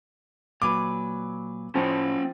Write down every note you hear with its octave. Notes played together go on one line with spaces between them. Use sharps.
A#2 F#3 B4 D6
A2 F3 C#4 G5